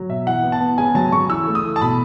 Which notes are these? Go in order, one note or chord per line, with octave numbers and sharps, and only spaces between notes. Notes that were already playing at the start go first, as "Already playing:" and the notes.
Already playing: F#3
B2 E5
E3 F#5
B3
A5
B3
C#3 G#5
F#3 A5
C#3 C#6
E3 E6
A3
D#6
E3
A5
B2 B5